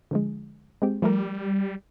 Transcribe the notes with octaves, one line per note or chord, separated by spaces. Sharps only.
D3 F3 G#3
G#3 C4 G4
F3 G3 A3 A#4